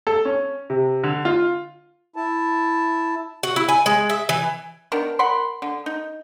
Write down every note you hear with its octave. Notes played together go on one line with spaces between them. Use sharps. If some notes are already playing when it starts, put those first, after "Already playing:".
A4
C#4
C3
D3
F4
E4 A5
F#4
E4
G#5
G#3
E5
E3
D#3 B3 D4 A#4
A#4 F#5 B5 C6
D3
D#4